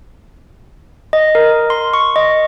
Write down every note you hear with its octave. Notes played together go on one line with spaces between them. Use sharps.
D#5
A#4
C6
C#6
D#5